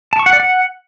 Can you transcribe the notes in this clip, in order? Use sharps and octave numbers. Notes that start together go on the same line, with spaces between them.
A5
C#6
F#5
D5
F#5